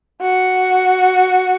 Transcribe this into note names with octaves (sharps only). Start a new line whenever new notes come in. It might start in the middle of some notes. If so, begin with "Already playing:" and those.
F#4